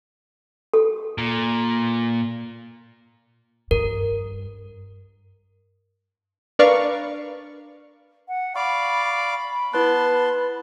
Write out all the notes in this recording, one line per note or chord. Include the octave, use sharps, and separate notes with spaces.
A4
A#2
G2 A#4
D4 A#4 B4 D5 F5 C#6
F#5
D5 F5 B5 C#6 D6
B3 E4 B4 A5 C6 F#6